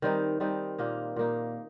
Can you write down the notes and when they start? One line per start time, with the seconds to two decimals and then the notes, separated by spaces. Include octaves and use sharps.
0.02 D#3 G3 C4 D#4
0.40 D#3 G3 C4 D#4
0.78 A#2 A#3 D#4
1.16 A#2 A#3 D#4